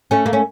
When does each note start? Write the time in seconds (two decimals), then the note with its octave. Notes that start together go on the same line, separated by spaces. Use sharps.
0.11 A3 C#4
0.26 A#3
0.33 C#4